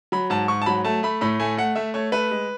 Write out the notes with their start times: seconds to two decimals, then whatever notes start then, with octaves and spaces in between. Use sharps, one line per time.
0.12 F#3 B5
0.30 G#2 A5
0.48 G#2 C#6
0.62 A5
0.66 F#3 B5
0.84 A3 A5
1.03 A3 B5
1.21 A2 B5
1.40 A3 G#5
1.57 A3 F#5
1.75 A3 E5
1.94 A3 C#5
2.12 A3 B4
2.31 G#3